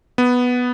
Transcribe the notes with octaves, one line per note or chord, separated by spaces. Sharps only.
B3